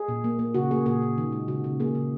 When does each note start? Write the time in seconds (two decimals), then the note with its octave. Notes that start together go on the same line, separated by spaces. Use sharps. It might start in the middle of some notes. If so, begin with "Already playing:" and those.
Already playing: G#4
0.08 A#2
0.24 A#3
0.39 A#3
0.54 C#3 F#4
0.71 A#3 G#4
0.86 A#2 G#4
1.02 A#2
1.18 D#3
1.32 G#3
1.48 C#3 F#4
1.64 C#3
1.80 A#3 G#4
1.95 C#3